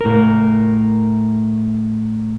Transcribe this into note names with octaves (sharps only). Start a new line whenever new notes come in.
A2 A#4